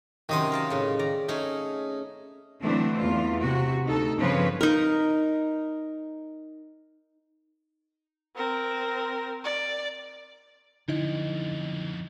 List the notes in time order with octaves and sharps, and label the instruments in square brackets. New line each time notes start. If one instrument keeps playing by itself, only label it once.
[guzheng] F#2 C3 D#4 [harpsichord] D#3 D#5 C6
[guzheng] A#4 F5 A5
A2 C#3
D5 A#5
[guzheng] A3 C#4 G#4 [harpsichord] D#4
[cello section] D3 E3 F#3 A3 C4 D4
E2 F4
C3 F#4
D2 D#4 A4
G2 C#3 F3 C4 B4 C#5
[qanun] D#4 A#4
[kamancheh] C4 A#4
D5
[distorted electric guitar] B1 F2 [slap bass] D3 [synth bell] D#4 E4 D#5